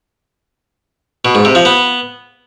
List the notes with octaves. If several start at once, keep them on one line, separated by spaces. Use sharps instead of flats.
B2
G#2
C3
F3
B3